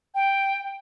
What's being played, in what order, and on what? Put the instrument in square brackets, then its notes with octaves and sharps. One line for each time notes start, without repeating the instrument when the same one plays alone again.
[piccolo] G5